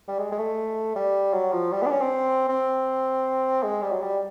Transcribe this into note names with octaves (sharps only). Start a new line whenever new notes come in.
G3
G#3
G#3
A3
G3
F#3
F3
G3
B3
D4
C#4
C4
C4
G#3
G3
F#3
G3